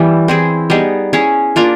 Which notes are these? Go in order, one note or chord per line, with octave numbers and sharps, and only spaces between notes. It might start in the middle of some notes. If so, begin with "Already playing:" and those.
Already playing: E3 G3 B3 E4
C4 E4 G#4
G3 B3 D#4 G#4
C#4 E4 G#4 C#5
A#3 D4 F4 A#4